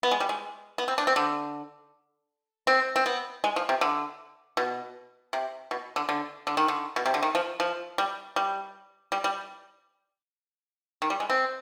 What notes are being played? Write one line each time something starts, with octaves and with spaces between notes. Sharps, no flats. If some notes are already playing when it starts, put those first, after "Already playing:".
B3
G#3
G3
G#3
B3
C4
D4
C4
D3
C4
C4
B3
G#3
F3
C3
D3
B2
C3
B2
D3
D3
D3
D#3
D3
B2
C3
D3
D#3
F3
F3
G3
G3
G3
G3
D#3
G3
G#3
C4